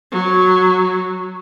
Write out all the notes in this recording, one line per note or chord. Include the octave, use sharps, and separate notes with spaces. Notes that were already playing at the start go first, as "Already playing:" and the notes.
F#3